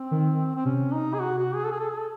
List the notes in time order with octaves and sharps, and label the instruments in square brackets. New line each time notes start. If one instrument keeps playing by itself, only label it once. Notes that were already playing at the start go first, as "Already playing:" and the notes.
Already playing: [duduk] C4
[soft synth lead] D#3
[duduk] C4
[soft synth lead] C3 [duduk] C#4
[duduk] D#4
G#4
F#4
F#4
G#4
A4
G#4
A4
G#4
A4